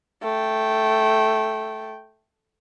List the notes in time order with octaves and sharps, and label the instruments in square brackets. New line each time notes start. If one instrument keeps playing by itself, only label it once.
[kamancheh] A3 G5